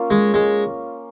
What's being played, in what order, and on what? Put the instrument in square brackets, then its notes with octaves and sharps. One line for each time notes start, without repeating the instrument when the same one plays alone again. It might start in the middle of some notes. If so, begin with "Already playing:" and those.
Already playing: [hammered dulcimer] A#3 C#4 F4
[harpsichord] G#3
G#3